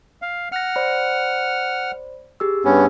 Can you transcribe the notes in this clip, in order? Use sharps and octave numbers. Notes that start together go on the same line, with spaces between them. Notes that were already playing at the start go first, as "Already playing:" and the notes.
F5
F#5 F6 A#6 C#7
C5 D5 B5
G4 G#4 E6
G2 B3 C#4